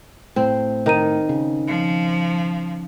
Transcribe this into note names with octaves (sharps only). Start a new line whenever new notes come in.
A2 C4
D#3 A#4 A#5 D#7
C#3
F3